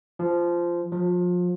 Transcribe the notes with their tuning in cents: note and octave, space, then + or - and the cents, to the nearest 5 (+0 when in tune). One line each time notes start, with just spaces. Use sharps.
F3 -15
F3 +30